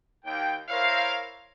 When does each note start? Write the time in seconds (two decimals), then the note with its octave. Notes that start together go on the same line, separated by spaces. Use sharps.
0.25 D#2 G5
0.69 E4 A#4 C5 C#5 E5 F5